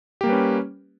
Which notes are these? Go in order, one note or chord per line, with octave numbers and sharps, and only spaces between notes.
G3 A#3 C#4 G4 B4